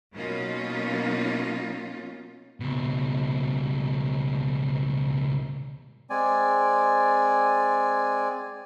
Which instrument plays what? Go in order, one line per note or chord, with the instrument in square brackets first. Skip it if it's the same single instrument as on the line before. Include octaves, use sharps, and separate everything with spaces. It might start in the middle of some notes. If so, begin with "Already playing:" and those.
[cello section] B2 F#3 A#3 C#4 D#4 F4
[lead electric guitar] C#2 B2
[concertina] G#3 C4 D5 G#5